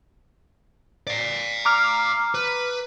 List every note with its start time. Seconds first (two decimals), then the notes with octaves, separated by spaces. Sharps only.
1.07 D5 F5
1.65 A#5 D6 F6
2.34 B4